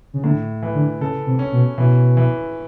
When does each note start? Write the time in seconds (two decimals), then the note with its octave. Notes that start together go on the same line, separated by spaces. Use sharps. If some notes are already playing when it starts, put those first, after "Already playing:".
0.14 C#3
0.24 A2 D3
0.62 E3
0.75 D3
1.00 C#3 A4
1.26 C3
1.39 C#4
1.52 B2
1.78 B2 E3
2.17 E3